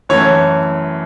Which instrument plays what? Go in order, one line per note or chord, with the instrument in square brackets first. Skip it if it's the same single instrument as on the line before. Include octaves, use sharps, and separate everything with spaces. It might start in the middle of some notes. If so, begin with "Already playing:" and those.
[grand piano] F#2 E3 A3 C#5